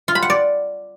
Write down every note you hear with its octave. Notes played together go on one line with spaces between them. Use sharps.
F4
B5
F#5
D5